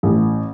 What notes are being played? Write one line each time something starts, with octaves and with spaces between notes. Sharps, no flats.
A1